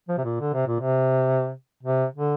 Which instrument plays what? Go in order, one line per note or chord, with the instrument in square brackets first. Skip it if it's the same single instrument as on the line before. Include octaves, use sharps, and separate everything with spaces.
[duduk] F3
C3
A#2
D3
C3
A#2
C3
C3
D3